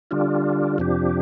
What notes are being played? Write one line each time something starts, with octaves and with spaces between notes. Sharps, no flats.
D3 G3 D4 F4
F2 C3 F3 D4 G4